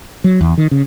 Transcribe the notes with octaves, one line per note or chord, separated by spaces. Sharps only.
F#3
E2
D#3
C#3